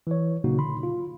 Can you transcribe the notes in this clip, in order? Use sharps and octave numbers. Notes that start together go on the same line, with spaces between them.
E3 C#5
A#2 C#3 F#3 A#3 D#4 F#4
D3 B5 C6
F4